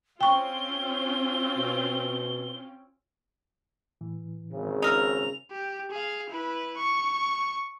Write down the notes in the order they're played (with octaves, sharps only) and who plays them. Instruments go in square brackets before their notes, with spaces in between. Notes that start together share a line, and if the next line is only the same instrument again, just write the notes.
[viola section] C4 C#4 F4 [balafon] G5 C#6 [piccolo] G7
[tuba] B2
[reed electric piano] A2 E3
[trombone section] G#1 C#3
[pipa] D#4 A#4 [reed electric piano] A#5 E6 [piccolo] F7
[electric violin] G4
G#4 F5
E4 B4
C#6